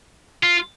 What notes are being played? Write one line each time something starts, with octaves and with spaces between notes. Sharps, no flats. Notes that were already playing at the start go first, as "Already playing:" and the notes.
F4